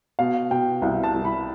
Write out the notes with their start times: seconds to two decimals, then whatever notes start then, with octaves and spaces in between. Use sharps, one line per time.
0.19 B2 F5
0.51 B2 G5
0.82 C2 F5
1.04 A5
1.14 C2
1.25 B5